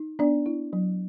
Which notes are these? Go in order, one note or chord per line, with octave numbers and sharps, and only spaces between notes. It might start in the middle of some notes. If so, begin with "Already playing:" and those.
Already playing: D#4
B3 D4 D5
E4
F#3